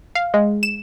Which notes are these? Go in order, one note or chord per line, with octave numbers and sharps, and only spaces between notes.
F5
G#3
E7